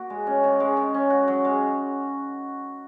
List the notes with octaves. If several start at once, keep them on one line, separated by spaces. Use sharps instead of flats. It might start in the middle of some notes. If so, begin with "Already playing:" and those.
Already playing: A#3 F#4
G#3
C#4
D#3
G#3
D#3
C#4
F#4
F#3
G#3